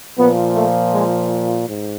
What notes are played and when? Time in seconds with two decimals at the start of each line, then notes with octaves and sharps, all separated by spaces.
0.17 A#2 F3 B3
0.55 A3
0.93 G#3
1.69 G#2